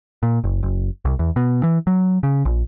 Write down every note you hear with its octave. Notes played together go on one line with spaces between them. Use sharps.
A#2
F#1
F#1
C2
E2
B2
E3
F#3
C#3
A#1